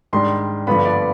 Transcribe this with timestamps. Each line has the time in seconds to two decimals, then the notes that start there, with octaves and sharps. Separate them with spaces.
0.13 G#2 D#3 G3 D4 C6
0.67 G2 D3 F3 B3 B5
0.85 D5